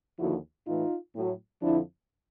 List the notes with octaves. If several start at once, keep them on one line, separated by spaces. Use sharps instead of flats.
D#2 D3 F3 E4 F#4
A2 E3 D#4 F4
A2 F#3
F2 D3 F3 D4 E4